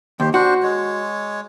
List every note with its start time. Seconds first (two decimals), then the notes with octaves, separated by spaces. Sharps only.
0.20 D#2 G4 C5
0.34 D4 F#4 C5
0.63 G#3 C#5